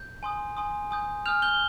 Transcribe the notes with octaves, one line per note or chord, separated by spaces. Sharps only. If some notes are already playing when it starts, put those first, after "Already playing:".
Already playing: G6
G#5 C6 D#6
G#5 C6 D#6
G#5 D#6 G6
G#5 D#6 F6 G6 F7
G6 G7